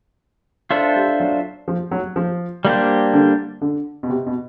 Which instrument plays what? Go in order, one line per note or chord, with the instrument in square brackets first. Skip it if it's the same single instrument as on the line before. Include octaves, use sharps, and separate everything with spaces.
[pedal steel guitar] D4 F4 A4 C5 E5
[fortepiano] G3
F#3
F3
F#3
F3
[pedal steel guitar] G3 A#3 D4 G4 C5
[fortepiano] D3
D3
B2
C3
B2